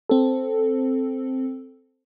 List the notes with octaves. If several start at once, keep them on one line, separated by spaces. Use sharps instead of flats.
C4 A4